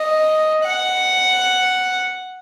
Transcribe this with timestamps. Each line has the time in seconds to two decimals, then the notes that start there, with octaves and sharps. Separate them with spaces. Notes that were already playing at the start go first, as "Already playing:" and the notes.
Already playing: D#5
0.65 F#5